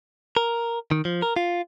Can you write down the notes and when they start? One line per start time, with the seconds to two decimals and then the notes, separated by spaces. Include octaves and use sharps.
0.37 A#4
0.91 D#3
1.05 F3
1.22 A#4
1.36 F4